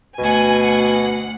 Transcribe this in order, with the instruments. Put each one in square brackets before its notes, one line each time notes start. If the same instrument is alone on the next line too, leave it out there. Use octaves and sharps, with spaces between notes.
[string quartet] D2 F#5 [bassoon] B2 [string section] G#5